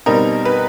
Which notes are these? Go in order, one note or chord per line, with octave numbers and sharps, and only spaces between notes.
B2 G3 C4 D#4 A#4
B4